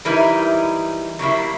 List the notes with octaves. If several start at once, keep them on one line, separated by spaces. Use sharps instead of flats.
E3 G3 G#3 D#4 E4 A#4
F#3 G3 A#3 E4